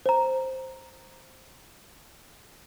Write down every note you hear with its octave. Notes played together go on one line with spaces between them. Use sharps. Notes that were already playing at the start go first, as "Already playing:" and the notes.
C5 A#5